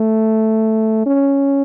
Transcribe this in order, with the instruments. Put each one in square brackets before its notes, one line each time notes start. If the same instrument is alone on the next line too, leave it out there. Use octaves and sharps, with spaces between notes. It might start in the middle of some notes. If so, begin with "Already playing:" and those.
Already playing: [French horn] A3
C#4